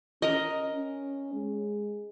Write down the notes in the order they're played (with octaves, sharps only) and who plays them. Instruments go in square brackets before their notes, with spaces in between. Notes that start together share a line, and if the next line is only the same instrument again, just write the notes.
[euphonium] C#4 [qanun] A#4 D#5
[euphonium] C#4
G#3